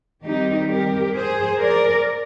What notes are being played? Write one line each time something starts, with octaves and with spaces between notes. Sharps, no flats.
D#3 G3 C4 D#4 G4
G4 A#4
G#4 C5
A#4 D5